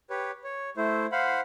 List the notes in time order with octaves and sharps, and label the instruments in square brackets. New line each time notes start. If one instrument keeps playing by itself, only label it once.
[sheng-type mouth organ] G4 B4 C#5
C#5
A3 E4 C5
C5 F5 F#5 B5